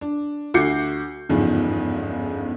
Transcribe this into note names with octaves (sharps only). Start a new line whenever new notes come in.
D4
D2 F#4 D6 G6 C7 C#7
G1 E2 G#2 C#3 F3